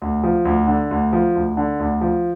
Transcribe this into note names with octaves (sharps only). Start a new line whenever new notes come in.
D2
F3
D2
D3
D2
F3
D2
D3
D2
F3